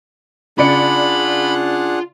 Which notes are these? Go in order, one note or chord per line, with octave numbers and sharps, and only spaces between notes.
C#3 D4 F4 G#4 D5 F#5 B5 C#7